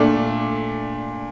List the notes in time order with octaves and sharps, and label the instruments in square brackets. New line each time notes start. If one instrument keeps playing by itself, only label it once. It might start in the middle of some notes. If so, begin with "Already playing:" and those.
Already playing: [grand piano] A#2 A3 D4